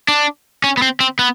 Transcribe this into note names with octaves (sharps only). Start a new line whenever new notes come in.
D4
C#4
B3
C4
C4
B3